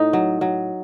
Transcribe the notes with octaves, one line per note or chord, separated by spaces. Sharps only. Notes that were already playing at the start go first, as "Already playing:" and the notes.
Already playing: A2 D#4
F#3
F#3